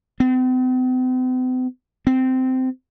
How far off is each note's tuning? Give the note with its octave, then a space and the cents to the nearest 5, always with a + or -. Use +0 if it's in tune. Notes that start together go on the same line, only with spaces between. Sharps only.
C4 -45
C4 -15